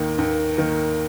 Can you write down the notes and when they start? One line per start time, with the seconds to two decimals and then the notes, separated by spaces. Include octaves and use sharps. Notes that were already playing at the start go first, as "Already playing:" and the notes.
Already playing: D#2 D#3 A#3
0.18 D#2
0.58 D#3 A#3